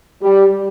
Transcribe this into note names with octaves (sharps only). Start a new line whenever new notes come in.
G3